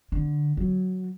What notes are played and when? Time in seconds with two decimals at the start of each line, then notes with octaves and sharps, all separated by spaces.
0.12 D3
0.57 F#3